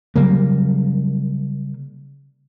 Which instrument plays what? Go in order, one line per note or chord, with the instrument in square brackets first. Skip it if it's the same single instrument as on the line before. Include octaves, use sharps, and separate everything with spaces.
[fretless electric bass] C#3 F#3 G3 A#3